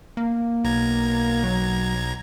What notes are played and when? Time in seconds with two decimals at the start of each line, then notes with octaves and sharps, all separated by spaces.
0.17 A#3
0.64 B1 A#5 G#6
1.43 F#3